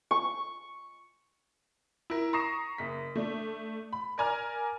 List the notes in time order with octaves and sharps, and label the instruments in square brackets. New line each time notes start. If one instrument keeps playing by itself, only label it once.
[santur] C#6
[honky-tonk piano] E4 A#4
A#5 C#6 D#6 A#6 C7 E7
F#1 B6
A3 D4
B5
A#4 D5 G#5 A#5 F6